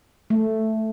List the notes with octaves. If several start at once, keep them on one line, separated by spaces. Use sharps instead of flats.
A3